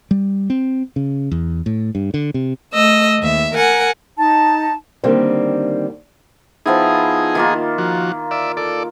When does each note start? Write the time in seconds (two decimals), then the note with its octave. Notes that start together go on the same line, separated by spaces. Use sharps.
0.11 G3
0.50 C4
0.96 C#3
1.31 E2
1.66 A2
1.95 G2
2.14 D3
2.34 C3
2.73 A3 D#5 E6
3.19 D#2 E5
3.54 A#4 F#5 G#5
4.18 D#4 A5
5.04 D3 D#3 G3 A#3 C4
6.66 F3 B3 D#4 E4 G#4
7.35 D#3 A#3 F4
7.78 F3 F#4
8.31 D5 E5
8.57 A4 D5